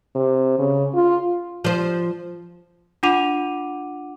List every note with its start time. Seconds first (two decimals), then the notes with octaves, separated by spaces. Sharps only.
0.15 C3
0.58 C#3
0.94 F4
1.65 F3 C5
3.03 D4 F4 F#5 D6 D#7 F7